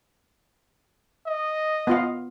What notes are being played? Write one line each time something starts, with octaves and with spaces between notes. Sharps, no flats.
D#5
B3 F4 F5